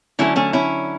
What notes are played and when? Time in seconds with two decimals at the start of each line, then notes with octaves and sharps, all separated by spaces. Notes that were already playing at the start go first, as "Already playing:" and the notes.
0.19 D3 F#3 A3 C#4 E4
0.36 A3 C#4
0.53 C#4 E4